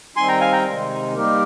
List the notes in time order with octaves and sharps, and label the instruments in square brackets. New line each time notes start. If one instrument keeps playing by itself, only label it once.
[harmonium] D#3 G3 C4 D#4 [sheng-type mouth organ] G#5 C6
[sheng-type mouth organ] G5 A#5
F5 G#5
G5 A#5
[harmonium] C3 D#3 G#3
G3 A#3 D#4 G4 A#4